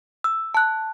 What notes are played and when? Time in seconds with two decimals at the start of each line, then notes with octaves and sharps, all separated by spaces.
0.24 E6
0.54 A5 F#6